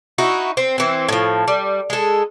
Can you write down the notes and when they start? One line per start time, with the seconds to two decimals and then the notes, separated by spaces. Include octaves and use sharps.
0.18 D#4 E4 F#4
0.57 C4
0.78 E3 C4
1.08 A2 F3
1.48 G3
1.90 G#3 A4